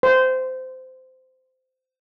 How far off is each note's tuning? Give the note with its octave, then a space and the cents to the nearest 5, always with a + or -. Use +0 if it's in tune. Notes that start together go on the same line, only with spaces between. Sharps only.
C5 -20